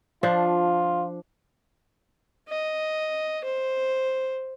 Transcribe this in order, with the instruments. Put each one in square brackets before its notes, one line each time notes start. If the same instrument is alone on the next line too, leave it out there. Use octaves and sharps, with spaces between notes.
[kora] F3 D4 [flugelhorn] F4
[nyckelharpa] D#5
C5